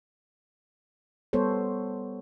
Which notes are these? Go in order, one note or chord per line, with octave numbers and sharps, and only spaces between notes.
G3 B3 A4 C5 C#5